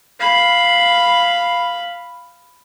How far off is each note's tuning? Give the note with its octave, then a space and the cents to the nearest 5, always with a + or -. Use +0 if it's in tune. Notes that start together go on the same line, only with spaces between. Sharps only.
F5 +0 B5 +0